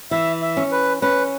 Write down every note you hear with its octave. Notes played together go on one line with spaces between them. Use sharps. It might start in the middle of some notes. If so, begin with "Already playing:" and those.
E3 E5
E5
C#4
B4
C#4 B4